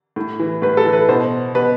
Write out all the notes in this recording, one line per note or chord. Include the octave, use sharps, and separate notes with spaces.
A2
E3
A2 B4
A4
E3
B4
B2 C5
B2 B4